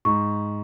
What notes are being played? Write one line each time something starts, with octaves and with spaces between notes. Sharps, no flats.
G#2 C#6